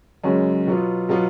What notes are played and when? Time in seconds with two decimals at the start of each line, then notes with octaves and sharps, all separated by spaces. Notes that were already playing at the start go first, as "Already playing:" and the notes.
0.23 F#2 C#3 G#3 C#4 F#4
0.67 B2 F#3 B3 F4
1.09 B2 F#3 B3 F4